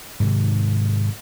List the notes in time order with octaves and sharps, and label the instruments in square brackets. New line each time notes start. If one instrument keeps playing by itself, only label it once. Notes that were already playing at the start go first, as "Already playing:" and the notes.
[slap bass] G#2 C3 D#3